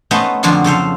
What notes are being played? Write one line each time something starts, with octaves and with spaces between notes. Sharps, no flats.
A3 B3 C#4 C5 D#5 A5
F2 D3 F3 F#3 D4 F4
C#3 A4 C5 F5